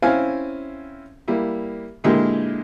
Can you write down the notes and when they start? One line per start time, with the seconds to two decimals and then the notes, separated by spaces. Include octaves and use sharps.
0.02 C4 C#4 E4 F5 G#5
1.28 G3 A#3 E4
2.04 A#2 D3 G#3 E4 G4 A#4